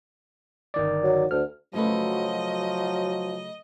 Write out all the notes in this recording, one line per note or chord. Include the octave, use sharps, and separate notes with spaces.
G1 D#3 D5
F#3
D2 F6
C#3 F3 F#3 A3 B4 D#5